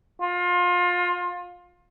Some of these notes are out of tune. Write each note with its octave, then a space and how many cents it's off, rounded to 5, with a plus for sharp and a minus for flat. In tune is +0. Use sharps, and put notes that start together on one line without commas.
F4 +25